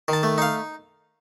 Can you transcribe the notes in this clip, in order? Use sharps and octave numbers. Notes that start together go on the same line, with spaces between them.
D#3 A5
A3
D#4 F5